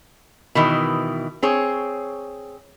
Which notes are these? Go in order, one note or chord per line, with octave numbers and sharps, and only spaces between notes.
B2 D#3 E3
C4 G#4 C#5